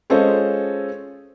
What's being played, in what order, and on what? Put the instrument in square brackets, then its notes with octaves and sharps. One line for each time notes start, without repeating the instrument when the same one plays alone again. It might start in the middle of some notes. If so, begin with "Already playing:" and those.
[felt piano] G#3 C#4 F4 A4 C5 D#5